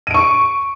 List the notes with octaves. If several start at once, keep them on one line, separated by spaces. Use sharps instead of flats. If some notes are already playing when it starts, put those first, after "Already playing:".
C#6 D7 D#7